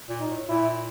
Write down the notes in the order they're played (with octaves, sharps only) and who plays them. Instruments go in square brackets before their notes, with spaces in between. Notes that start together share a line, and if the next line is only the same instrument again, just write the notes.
[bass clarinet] A#2
[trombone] D#4
[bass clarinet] A2
[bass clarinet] A#2 [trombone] E4